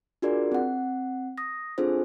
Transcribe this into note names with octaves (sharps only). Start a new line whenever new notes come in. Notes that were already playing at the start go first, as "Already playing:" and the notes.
D4 F4 F#4 G#4 A#4 D5
C4 F#5
D#6 A#6
C4 D4 F4 G#4 A4 C5